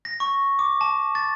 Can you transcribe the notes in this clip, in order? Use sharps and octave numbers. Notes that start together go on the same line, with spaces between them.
A#6
C#6
D6
A5
A6